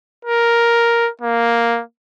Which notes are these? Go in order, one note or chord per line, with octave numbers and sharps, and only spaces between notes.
A#4
A#3